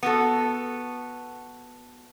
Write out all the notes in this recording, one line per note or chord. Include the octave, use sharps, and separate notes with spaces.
B3 F#4 A4